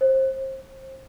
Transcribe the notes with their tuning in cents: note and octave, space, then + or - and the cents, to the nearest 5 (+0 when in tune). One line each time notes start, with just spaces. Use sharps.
C5 +25